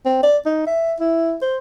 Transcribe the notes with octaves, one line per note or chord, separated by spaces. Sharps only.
C4
D5
D#4
E5
E4
C5